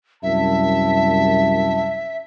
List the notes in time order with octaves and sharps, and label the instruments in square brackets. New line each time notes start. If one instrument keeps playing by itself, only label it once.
[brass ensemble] C2 F#2 A5 [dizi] E5